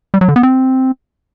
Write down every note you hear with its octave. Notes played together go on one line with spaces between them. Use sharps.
G3
F#3
D3
B3
C4